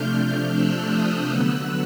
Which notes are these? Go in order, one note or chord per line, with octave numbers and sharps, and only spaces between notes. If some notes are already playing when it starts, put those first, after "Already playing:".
Already playing: C3 F3 A3 D4 F6 G6
F6 G6
E6 F#6
D#6 F6
D3 F#3 B3 E6 F#6